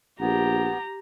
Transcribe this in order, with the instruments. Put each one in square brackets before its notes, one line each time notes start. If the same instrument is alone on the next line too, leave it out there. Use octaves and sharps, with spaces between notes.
[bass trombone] A#1 [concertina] B3 [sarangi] G4 [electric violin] A#5